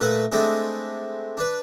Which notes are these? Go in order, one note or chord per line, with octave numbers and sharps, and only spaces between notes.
A#2 A3 B4 E5 F#5
G#3 A3 C4 D4 E4 G#4
D4 B4